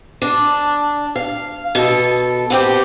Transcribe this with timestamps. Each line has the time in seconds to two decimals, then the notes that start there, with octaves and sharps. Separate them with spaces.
0.22 D4
1.16 F5
1.75 B2 A4
2.50 B3 C4 G4